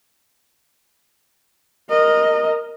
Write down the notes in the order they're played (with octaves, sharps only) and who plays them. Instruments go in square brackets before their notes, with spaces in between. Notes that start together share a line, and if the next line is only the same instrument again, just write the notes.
[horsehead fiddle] A#4 D#5